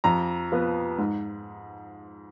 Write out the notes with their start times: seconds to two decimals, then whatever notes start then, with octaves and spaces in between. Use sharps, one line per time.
0.04 F2 A#5
0.52 F3 B3
0.98 G#2